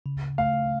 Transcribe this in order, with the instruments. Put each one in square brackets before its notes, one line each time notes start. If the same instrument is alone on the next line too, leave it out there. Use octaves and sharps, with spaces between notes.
[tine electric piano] C#3
[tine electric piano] A3 [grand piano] F5